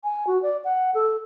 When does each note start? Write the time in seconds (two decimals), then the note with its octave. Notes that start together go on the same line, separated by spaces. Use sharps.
0.04 G#5
0.27 F#4
0.43 D5
0.64 F#5
0.94 A4